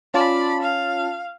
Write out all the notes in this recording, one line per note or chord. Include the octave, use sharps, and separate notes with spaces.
C#4 F4 D5 A5 B5
F5